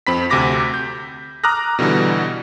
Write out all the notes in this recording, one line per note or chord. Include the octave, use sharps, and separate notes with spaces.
F2 C4 B5 B6
D2 C3 B5 D6 A#6 B6
G6
A#5 D6 D#6 F6 F#6 A#6
B2 D3 E3 G3